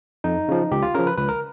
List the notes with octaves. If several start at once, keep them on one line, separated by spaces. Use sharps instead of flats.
F2 D#4
C#3 F3
C#2 G4
F4
C#3 F3 A#4
B4
C#2 B4
A#4